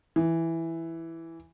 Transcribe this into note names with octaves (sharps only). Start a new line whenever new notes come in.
E3